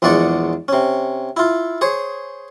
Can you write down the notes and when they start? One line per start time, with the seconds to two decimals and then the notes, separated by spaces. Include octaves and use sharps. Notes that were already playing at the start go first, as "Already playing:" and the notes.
0.02 A#1 E2 G#3 D5 F#5 C#6
0.68 C3 C#4
1.37 E4 F4
1.81 G#4 C5 C#5